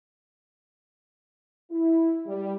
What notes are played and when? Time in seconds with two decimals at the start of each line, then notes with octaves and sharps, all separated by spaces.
1.71 E4
2.26 G3